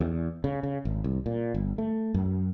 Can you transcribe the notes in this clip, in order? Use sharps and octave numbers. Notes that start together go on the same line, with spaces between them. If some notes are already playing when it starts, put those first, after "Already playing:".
E2
C#3
C#3
G#1
C2
A#2
G1
A3
F#2